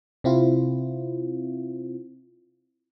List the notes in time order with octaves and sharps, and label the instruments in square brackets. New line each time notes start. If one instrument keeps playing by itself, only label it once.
[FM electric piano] C3 C4 E4 F4